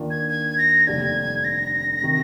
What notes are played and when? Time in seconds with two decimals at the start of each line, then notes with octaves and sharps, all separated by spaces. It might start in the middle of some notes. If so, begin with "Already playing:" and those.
Already playing: D#2 D#3 A#3 D4 F4
0.10 G#6
0.30 G#6
0.58 A#6
0.87 F1 D#2 D3 G3 D4 G#6
1.44 A#6
2.03 C3 D#3